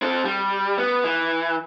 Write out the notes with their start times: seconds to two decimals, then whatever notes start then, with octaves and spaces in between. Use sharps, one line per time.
0.02 C4 A4
0.25 G3
0.78 B3
1.05 E3